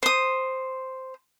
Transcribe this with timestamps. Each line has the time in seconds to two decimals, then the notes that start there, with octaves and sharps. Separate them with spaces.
0.03 C5 D#6